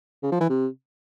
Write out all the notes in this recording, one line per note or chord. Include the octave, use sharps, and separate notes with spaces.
C#3
F3
E3
C3